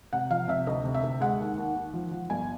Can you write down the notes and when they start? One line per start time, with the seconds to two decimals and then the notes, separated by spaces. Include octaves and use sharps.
0.13 C3 F#5
0.30 F3 F5
0.48 C3 E5
0.67 D2 D#5
0.85 C3
0.94 E5
1.03 D2
1.21 G#3 F#5
1.40 D#2
1.57 D#2
1.75 D#2
1.93 F3
2.11 F3
2.30 G1 G#5